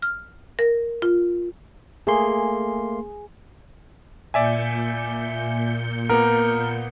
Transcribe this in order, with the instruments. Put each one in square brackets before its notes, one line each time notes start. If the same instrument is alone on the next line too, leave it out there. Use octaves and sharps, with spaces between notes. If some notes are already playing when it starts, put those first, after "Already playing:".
[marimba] F6
A#4
F4
[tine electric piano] A3 A#3 C6 [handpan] G#4
[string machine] A#2 G6 C#7 [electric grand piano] D5 E5 G#5
[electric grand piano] A#3 B3 [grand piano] A#4